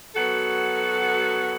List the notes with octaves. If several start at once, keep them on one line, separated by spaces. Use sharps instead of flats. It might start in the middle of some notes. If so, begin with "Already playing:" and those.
F#3 B3 F#4 A4